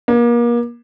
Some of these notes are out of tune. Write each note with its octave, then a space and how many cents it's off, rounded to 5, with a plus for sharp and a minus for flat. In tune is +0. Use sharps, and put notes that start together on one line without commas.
A#3 +35